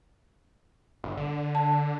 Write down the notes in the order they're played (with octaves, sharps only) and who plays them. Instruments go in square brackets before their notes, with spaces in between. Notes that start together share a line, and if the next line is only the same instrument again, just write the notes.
[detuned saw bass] G1
D3
[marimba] A5